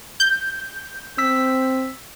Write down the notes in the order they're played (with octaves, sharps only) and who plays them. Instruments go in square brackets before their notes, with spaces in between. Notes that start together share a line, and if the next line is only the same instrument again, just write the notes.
[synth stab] G6
[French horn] C4 [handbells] E6 B6